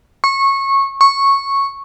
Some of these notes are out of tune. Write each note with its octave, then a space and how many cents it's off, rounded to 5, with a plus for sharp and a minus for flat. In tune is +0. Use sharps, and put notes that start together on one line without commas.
C#6 -20
C#6 -10